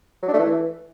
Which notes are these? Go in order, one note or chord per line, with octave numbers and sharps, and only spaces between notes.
F#3
D4
A3
E3